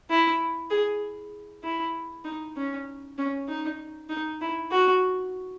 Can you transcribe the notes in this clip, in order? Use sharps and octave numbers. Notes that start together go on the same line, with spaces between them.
E4
G#4
E4
D#4
C#4
C#4
D#4
D#4
E4
F#4